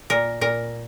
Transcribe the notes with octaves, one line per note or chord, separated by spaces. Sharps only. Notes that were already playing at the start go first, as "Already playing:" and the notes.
A#2 A#4
A#2 A#4